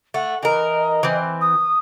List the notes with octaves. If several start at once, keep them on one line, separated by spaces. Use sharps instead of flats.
A3 F#5
E3 A#4 D#5
E3 C4
D#6